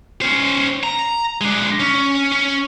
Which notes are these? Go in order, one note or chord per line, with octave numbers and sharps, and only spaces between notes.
C#4 C5
A#5
G#3 D4
C#4
C#4